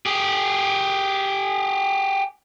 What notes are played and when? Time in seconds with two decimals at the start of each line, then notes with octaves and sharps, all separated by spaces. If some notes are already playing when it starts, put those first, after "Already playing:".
0.06 G4 G#4